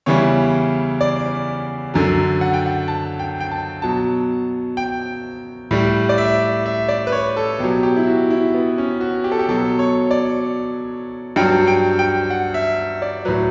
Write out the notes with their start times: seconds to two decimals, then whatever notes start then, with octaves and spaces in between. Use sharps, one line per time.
0.06 E2 C#3 E3 G3 C#5
1.01 D5
1.94 F#2 D3 F#3
2.41 F#5
2.54 G5
2.66 F#5
2.88 A5
3.19 G5
3.41 G5
3.51 A5
3.82 B2 F#3 A5
4.77 G5
5.71 A2 G3
6.09 D5
6.18 E5
6.66 E5
6.88 D5
7.07 B4
7.12 C#5
7.37 A4
7.59 B2 F#3 G4
7.83 G4
7.96 E4
8.07 F#4
8.30 E4
8.54 B3
8.78 C#4
9.00 F#4
9.24 G4
9.32 A4
9.39 G4
9.49 B2 F#3 A4
9.79 C#5
10.11 D5
11.36 G2 F#3 G5
11.68 G5
11.99 G5
12.30 F#5
12.54 E5
13.02 D5
13.25 A2 F#3 B4